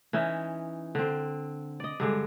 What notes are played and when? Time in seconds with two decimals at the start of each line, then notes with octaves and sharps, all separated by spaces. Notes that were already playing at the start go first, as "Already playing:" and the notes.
0.13 E3 C#4 D#4 E5
0.95 D3 C4
1.80 D5 D#5
2.00 G2 D3 G#3